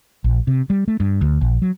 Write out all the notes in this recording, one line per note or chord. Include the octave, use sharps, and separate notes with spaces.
A#1
C3
G3
A3
G2
D2
A#1
F#3